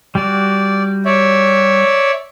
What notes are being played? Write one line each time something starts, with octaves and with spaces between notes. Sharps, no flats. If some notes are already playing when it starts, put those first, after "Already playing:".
G3 F#4 D5
C#5 D5 E5